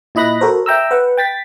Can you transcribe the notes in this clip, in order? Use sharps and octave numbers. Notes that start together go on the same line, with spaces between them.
A#2 E4 D#5 B5 F#6 A#6
F#4 A4 A#4 C5
E5 G5 A#5 E6
B4 F#5
G5 A6 B6